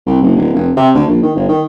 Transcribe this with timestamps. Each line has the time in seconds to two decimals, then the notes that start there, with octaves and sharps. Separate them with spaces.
0.06 C2
0.22 F#1
0.36 D1
0.54 F1
0.77 C3
0.94 D2
1.08 A#1
1.22 D#3
1.36 G1
1.48 D#3